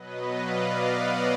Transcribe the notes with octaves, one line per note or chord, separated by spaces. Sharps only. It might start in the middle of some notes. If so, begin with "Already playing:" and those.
Already playing: B2 F#3 B3 B4 D#5
D5 F5
D#5 F#5